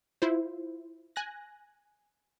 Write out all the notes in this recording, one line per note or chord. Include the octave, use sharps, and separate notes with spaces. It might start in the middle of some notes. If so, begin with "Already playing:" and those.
E4 F4 C5
G#5 F#6 A#6